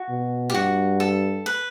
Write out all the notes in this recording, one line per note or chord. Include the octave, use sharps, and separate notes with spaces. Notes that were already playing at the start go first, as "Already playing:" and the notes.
Already playing: F#4
B2
G4
G2 F#4
A4
B4